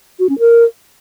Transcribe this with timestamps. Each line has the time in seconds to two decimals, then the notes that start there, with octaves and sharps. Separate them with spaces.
0.19 F#4
0.29 C#4
0.39 A#4